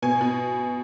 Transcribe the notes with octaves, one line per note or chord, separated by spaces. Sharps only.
B2 G#5
B2